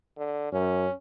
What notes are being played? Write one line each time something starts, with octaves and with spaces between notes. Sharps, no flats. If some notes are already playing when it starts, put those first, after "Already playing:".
D3
F#2 C#4